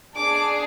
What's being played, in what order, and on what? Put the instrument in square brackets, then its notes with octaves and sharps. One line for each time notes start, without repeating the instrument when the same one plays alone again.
[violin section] D4 G#4 D6